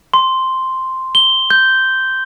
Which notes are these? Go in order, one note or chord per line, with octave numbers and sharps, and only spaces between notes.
C6
G7
G6